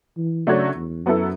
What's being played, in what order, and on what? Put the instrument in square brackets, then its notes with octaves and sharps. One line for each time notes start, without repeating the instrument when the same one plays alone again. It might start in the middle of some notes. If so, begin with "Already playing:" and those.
[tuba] E3
[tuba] C#3 [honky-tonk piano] F#3 A3 D4 F#4 C#5
[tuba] E2
[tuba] F#2 [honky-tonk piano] F#3 B3 E4 A4